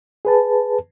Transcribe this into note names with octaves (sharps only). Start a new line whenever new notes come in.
G#4 B4 A5